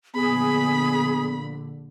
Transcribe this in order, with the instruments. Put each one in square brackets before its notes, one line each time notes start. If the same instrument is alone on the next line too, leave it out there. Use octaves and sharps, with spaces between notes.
[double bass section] A#1 D3 [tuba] B3 [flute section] G#4 [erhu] B5